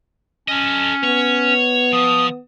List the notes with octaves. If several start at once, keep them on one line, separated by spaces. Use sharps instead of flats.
C#4 A4 D#5
B3 C#5
F3 D#6